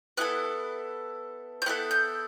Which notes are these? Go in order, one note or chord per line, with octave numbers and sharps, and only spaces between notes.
B3 E4 A4 F#6
G6
B3 E4 A4 F#6
G6